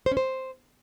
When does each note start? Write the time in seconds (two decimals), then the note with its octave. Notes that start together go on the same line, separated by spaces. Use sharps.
0.06 C5
0.12 C#4
0.17 C5